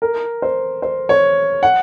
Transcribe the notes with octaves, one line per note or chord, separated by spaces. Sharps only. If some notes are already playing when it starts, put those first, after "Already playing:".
A#4
C5
C5
C#5
F#5